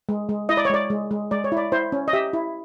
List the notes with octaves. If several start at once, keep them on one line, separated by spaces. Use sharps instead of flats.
G#3
G#3
E4 D#5
D5
C#5
G#3 D5
G#3
G#3
G#3 D5
C#5
E4 D5
E4 C5
C#4
D#5
G4 E5
E4